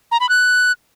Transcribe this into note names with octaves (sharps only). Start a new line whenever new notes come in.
A#5
B5
F#6